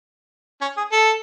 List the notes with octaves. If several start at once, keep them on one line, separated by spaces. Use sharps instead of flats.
C#4
G#4
A4